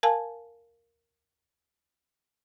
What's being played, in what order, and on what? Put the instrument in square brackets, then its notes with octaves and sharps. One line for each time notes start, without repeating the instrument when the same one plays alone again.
[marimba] A#4 F5 G#5 A5